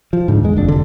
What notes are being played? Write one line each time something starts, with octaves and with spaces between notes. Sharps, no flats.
F3
G#2 D3
E2 G#3
F#1 F2 D4
F1 D3